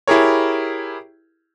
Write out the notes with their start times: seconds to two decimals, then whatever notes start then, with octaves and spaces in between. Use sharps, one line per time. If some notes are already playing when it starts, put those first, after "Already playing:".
0.08 E4 G4 G#4 A#4 C#5